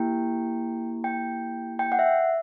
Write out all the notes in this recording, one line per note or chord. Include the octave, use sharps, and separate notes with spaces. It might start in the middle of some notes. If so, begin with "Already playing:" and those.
Already playing: A#3 E4 G4 G5
G5
G5
F#5
E5